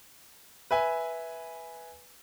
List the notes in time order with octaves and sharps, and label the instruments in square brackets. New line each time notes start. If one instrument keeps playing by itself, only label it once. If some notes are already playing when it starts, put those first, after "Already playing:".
[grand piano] B4 E5 G#5